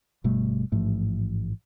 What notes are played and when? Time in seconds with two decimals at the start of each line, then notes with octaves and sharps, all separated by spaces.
0.24 G1 B2 G3 A3
0.72 A1 G#2 F3 A3